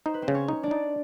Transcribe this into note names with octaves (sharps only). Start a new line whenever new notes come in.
D#4 C5
B4
C4 C5
C#3
C#4 C#5
D#4
D4 D5
D#4